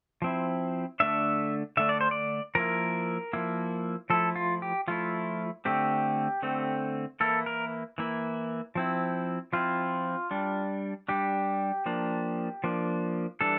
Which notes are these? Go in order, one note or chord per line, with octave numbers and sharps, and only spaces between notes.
F3 C4 E4
D3 A3 D4 E5
D3 A3 D4 E5
D5
C5
D5
F3 A#3 E4 A#4
F3 A#3 E4
F3 A3 E4 A4
F4
G4
F3 A3 E4 F4
D3 A3 C4 G4
D3 A3 C4
E3 A#3 E4 A4
A#4
E3 A#3 E4
F3 C4 E4
F3 C4 E4 F4
G3 D4
G3 D4 G4
F3 A#3 D4
F3 A#3 D4
E3 G3 D4 A4